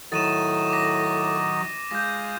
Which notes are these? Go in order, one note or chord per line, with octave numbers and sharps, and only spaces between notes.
A2 D#3 F#3 D#4 A6 D#7 E7
D6 A#6
G#3 F4 G6 A#6